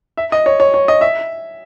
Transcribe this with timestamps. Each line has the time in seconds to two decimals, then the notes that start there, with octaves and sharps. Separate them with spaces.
0.17 E5
0.32 D#5
0.46 C#5
0.60 C#5
0.74 C#5
0.88 D#5
1.01 E5